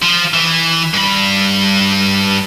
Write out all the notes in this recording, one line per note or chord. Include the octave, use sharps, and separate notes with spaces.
F3
E3
G2 B5